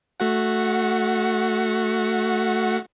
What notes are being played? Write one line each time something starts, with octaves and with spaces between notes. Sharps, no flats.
A3 F#4 F#5